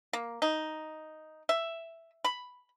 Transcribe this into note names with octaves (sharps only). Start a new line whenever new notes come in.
A#3
D#4
E5
B5